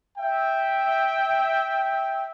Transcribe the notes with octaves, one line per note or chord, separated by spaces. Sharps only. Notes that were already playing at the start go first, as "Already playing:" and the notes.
E5 G5